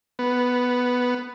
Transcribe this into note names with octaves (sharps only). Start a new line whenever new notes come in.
B3